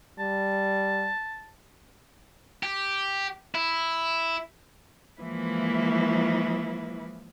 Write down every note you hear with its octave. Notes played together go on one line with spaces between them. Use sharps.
G3 A5
G4
E4
E3 F3 G#3 A#3 E4 B4